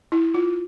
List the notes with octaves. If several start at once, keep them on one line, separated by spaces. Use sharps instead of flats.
E4
F4